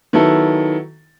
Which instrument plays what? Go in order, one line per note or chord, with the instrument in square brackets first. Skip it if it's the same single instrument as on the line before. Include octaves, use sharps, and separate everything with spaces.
[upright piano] D#3 F#3 B3 E4 A4